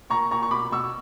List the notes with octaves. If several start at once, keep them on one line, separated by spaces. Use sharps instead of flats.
A#2 A#5 C#6
A#2 A#5 C#6
C#6
B2 B5 D6
B2 C#6 E6